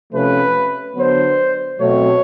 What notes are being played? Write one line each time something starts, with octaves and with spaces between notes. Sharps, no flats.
C3 F3 A3 C#4 B4
D3 F#3 B3 D4 C5
B2 F#3 A3 C4 C#5